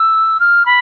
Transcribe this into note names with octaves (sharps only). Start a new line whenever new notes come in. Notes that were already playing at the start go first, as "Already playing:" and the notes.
Already playing: E6
F6
B5